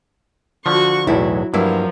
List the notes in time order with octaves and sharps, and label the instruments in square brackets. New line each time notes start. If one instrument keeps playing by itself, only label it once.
[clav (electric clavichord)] D3 F3 [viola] F#4 C#6
[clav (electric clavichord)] B1 E2 A2 [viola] F#3 [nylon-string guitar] E4
[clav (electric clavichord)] G2 E4 [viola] F3 [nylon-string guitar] F#3 A#3